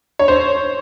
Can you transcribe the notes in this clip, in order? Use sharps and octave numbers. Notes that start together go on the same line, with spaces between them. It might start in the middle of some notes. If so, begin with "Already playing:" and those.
C#5
C5